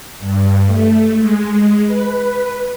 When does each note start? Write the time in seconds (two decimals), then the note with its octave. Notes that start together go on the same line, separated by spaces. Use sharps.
0.20 G2
0.66 A3
1.19 G#3
1.86 B4